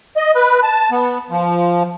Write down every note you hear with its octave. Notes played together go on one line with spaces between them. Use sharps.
D#5
B4
A5
B3
F3